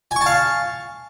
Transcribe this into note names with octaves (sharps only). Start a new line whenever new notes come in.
F5 G#5 A5 C#6